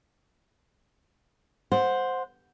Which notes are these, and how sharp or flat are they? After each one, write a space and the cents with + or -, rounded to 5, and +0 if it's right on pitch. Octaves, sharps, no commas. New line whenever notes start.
C5 +0 F#5 -20